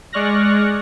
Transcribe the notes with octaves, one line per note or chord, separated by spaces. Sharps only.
G#3 D5 C#6 F6 F#6 A#6